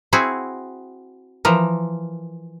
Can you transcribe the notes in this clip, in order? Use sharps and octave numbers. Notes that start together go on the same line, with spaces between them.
C4 E4 F#4 G#4
E3 F3 A#4